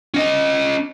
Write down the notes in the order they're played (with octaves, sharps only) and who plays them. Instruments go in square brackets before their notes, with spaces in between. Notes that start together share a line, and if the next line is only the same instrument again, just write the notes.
[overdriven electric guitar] C#4 D#5